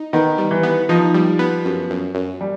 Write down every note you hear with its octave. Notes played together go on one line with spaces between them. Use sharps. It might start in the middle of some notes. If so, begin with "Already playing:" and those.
Already playing: D#4
D#3 B3
G3
E3
B3
F3 D#4
G3
B3
F#2
F#2
F#2
G3